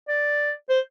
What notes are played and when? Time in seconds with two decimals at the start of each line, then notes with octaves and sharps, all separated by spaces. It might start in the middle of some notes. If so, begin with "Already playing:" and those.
0.08 D5
0.69 C5